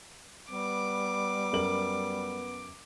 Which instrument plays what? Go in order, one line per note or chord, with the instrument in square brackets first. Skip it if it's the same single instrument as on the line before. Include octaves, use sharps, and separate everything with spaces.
[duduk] G3 [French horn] B3 [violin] D6
[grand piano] F#2 A#4 F#7